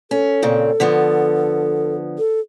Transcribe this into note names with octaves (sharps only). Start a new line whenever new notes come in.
C#4 A4
A#2 C#3 C4
D3 F3 B3
A4